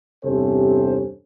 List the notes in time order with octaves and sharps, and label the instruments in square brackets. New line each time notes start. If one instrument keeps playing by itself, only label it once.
[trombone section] E2 G2 C3 C#4 A4 C5